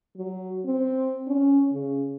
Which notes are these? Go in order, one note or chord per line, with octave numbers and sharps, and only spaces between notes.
F#3
C4
C#4
C#3